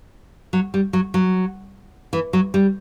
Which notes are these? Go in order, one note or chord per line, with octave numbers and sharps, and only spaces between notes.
F#3
G3
F#3
F#3
E3
F#3
G3